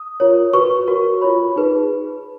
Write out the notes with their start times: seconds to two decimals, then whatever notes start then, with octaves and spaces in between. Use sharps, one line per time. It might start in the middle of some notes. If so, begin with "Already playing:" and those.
Already playing: D#6
0.20 F4 A#4 C#5
0.53 F#4 B4 C#6
0.87 F#4 A#4 C#5
1.21 F4 A#4 C#5 B5
1.56 D#4 G#4 B4